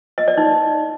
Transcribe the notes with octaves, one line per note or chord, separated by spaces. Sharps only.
D#5
D5
D#4